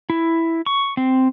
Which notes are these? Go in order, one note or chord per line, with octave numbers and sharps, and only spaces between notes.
E4
C#6
C4